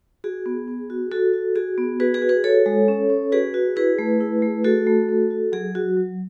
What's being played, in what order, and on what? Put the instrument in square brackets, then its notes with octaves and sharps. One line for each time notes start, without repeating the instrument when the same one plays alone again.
[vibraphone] F#4 G#4
B3
B3
F#4
F#4 A4
F#4
F#4 G#4
B3
F#4 G#4 B4
G#4 B4
F#4
G#4 B4
F#4 A4 C#5
G#3
C#4
C#4
F#4 G#4 B4
F#4
E4 G#4 B4
A3
E4
A3
A3 F#4 A4
A3
A3
F#4
F#3 G#4
F#3 F#4
F#3